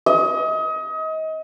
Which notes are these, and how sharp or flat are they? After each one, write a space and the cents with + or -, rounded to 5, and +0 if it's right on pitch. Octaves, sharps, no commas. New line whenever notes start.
D#5 +30